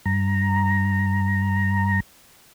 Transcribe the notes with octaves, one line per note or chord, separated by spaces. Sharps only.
G2 A#5